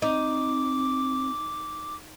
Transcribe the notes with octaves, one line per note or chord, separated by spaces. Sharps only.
C4 D#4 D6